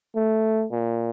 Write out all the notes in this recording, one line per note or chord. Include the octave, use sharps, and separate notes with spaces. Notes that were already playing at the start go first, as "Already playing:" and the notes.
A3
A#2